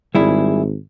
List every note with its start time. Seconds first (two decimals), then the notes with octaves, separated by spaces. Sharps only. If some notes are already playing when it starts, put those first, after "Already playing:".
0.15 G#1 G3 E4 G#4